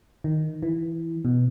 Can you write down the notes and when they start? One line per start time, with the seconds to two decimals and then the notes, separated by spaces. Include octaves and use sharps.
0.24 D#3
0.63 E3
1.25 B2